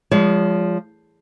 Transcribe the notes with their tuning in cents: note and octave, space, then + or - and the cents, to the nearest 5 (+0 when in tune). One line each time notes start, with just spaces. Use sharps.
F3 +0 G#3 -25 C#5 +45